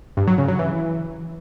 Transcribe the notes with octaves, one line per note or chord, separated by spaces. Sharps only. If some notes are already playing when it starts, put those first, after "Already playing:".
G2
F#3
C#3
F#3
E3